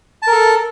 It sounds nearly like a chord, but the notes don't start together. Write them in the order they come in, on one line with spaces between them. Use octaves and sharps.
A5 A#4 A4